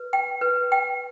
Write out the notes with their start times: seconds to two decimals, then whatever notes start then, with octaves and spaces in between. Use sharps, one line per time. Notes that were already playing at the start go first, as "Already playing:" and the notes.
Already playing: B4
0.13 G5
0.41 B4
0.72 G5